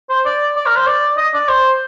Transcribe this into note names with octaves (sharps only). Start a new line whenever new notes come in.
C5
D5
D5
A#4
C5
D5
D#5
D5
C5